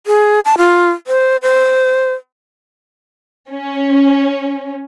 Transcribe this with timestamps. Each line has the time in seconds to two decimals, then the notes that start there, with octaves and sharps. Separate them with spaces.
0.07 G#4
0.45 A5
0.58 F4
1.07 C5
1.42 C5
3.49 C#4